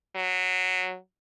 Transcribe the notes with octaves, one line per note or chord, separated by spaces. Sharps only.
F#3